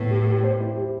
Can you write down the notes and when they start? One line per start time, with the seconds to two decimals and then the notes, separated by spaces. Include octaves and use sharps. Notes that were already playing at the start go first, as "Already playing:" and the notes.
Already playing: A2 B3
0.11 G4
0.27 G4
0.43 C5
0.60 E4
0.76 G4